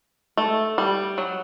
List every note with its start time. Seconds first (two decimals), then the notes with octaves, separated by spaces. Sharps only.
0.37 A3
0.78 G3
1.18 F#3